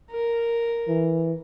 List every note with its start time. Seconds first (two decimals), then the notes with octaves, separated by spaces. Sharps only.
0.10 A#4
0.88 E3